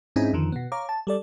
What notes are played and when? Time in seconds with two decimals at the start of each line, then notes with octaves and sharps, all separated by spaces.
0.16 G#2 C4 C#4 D#4 E4 G#4
0.33 F2 D3 D#3 F3
0.52 B2 B3
0.72 C#5 F5 A#5 D6
0.89 A5
1.07 G3 A4 D5